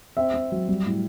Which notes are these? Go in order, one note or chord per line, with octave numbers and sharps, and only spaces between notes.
C4 E5
C4
F#3
G3
A2